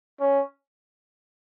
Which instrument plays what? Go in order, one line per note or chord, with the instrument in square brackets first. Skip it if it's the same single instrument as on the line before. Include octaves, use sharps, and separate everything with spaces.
[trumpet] C#4